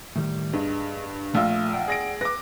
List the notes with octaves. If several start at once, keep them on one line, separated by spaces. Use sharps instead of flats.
A2 D#3 G3
G2 G#4 D#5
A#1 A3 F4 E6
D5 F#5 G5
G#4 A#6 D7
B4 D6 A#6